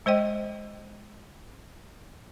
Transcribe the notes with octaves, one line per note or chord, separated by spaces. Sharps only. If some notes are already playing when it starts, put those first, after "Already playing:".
G#3 C5 D#5 G5